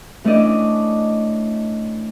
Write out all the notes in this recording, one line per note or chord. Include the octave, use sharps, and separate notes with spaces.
E3 A3 C#4 D4 D5 D#5